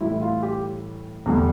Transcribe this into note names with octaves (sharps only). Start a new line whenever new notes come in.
A2 E3 G3 E4
F4
G4
E2 D3 G3